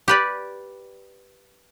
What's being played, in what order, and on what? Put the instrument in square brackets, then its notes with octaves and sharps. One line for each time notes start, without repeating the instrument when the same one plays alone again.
[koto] G4 B4 D5